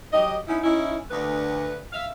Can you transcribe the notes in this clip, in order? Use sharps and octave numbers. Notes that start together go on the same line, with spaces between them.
F#3 G4 D#5
B3 C#4 D#4 E4
C#4 D#4 E4
D2 B4
E5 F5